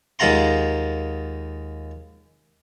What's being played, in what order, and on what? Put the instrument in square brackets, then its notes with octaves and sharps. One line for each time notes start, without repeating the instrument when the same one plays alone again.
[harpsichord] D#2 G#3 F4 F#5 A#5 C6